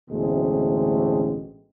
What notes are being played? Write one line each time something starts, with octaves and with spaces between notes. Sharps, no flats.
A1 D2 B2 G#3 A3 C4